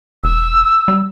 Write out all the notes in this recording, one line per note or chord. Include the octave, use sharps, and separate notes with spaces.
E1 E6
G3